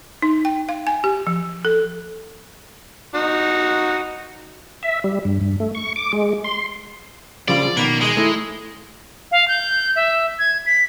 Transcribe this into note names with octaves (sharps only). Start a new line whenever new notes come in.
D#4
G5
F5
G#5
G4
F3
A4
D#4 F#4
E5
G3
G2
G2
A3
C#6
D6
G#3
C6
A#1 A#2 C#3 G3 F4 D5
B2 D#3 A#3 F#5 B5
G#3 D#4 G#4 D#5
A3 E4
F5
G6
E5
G#6
B6